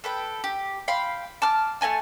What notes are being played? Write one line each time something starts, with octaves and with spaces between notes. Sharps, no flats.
A4 B4 G5
G4
F5 G5 B5 C6
A5 D6 F6
A3 D#5 G#5 A5